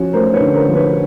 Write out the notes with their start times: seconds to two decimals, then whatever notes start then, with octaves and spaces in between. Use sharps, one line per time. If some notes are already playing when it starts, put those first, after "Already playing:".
Already playing: F3 C#4 F#4
0.13 A3 A#4 C5
0.34 B4 C#5
0.41 D3
0.54 A#4 C5
0.69 F3
0.75 B4 C#5